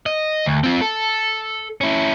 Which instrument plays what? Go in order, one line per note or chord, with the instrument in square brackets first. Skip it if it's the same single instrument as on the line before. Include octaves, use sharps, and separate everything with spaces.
[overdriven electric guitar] D#5
D2
C4 F4
A4
C#4 E4